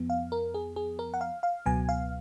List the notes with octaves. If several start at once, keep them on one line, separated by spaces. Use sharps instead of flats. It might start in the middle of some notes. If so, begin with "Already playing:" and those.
Already playing: F2 F3 B3
F5
A#4
G#4
G#4
A#4
F#5
F5
F5
C#2 B2 F#3 B3 G#5
F5